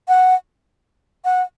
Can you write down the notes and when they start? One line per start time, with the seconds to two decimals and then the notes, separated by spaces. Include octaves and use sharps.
0.08 F#5
1.25 F#5